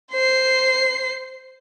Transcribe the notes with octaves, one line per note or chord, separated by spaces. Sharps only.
C5 C7